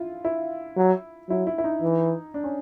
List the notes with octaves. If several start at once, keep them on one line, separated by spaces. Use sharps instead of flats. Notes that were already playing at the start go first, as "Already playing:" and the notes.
Already playing: E4 F4
E4
F#3
F#3 E4
E4
E4
D#4
E3
D4
C#4